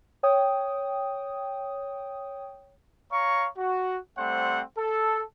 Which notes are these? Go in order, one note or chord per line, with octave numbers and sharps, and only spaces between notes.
C#5 G5 D#6
C#5 F5 A#5 C#6
F#4
G3 A3 C4 C5 F#5
A4